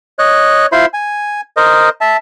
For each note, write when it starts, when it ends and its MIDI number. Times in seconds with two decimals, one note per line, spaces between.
0.19 0.66 73
0.19 0.66 75
0.19 0.66 90
0.72 0.86 64
0.72 0.86 65
0.72 0.86 72
0.72 0.86 76
0.72 0.86 83
0.72 0.86 84
0.94 1.41 80
1.57 1.89 70
1.57 1.89 72
1.57 1.89 75
2.01 2.17 76
2.01 2.17 81